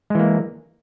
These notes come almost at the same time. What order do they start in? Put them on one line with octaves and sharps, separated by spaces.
G#3 E3 A#3